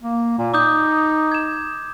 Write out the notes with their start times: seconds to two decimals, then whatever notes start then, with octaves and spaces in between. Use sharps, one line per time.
0.02 A#3
0.38 A#2
0.54 D#4 D6 D#6 G6
1.32 G#6 E7